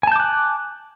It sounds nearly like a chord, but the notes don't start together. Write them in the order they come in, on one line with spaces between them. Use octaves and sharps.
G#5 A5 G6 D6 F#6